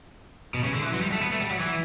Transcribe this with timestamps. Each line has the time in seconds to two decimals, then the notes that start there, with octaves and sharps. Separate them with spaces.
0.54 B2
0.64 C#3
0.74 D3
0.83 E3
0.93 F#3
1.02 G3
1.12 A3
1.22 B3
1.31 A3
1.41 G3
1.50 F#3
1.60 E3